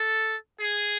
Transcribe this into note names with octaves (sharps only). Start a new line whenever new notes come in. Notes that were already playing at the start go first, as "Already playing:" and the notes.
Already playing: A4
G#4